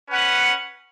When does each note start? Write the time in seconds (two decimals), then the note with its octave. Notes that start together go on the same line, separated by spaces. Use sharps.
0.10 C#4 B4 F#5